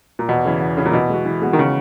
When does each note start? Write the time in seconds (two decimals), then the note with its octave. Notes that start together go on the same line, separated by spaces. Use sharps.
0.19 A#2
0.28 E2 B2
0.45 C#3 E3
0.61 E2
0.77 C#3 E3
0.85 A#2
0.93 B2 E3
1.10 G#3 B3 F#4
1.25 E3
1.42 G#3 B3 F#4
1.53 D#3
1.59 C#3